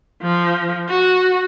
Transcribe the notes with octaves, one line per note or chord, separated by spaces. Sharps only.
F3
F#4